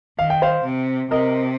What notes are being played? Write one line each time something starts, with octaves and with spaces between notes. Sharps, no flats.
D#3 F5
G5
C5 F5
C3
C3 A#4 D#5